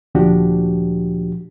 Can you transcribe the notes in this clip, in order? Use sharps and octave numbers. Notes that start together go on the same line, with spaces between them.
D2 A#2 F3 D4 F#4 G4